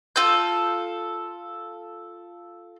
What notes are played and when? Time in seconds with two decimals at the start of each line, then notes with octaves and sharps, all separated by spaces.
0.16 F4 A4 G6